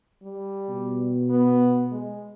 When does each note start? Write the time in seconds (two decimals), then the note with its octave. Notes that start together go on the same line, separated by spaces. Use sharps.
0.23 G3
0.69 B2
1.30 B3
1.91 G#3